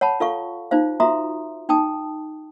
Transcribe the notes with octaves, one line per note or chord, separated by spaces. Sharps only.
C#5 F#5 A5 B5
F4 A4 F5 C#6
D#4 F4 C5 F5
F4 F#4 E5 A#5 C6 D#6
D#4 G5 A5 D#6